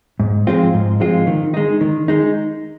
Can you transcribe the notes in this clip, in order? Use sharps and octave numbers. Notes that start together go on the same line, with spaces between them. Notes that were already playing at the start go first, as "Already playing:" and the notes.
G#2
F3 G#3 C4 F4
G#2
F3 G#3 C4 F4
D#3
G#3 D#4
D#3
G#3 D#4